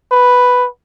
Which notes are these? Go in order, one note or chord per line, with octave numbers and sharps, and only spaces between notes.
B4